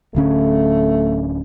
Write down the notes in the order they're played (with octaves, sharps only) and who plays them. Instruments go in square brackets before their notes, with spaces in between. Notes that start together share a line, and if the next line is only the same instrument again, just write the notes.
[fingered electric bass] D1 D3 C#4 [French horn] A3